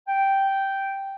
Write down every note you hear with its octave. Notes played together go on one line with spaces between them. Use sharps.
G5